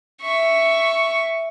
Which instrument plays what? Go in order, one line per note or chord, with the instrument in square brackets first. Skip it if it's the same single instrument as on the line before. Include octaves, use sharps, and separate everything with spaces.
[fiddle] E5 C#6